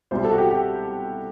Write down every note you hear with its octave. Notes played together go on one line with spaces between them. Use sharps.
C2 B2 G3 C4 C5
A4
F#4
G4
G4